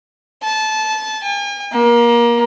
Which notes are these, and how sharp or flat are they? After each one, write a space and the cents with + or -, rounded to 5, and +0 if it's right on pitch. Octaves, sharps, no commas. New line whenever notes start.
A5 -20
G#5 -45
A#3 +25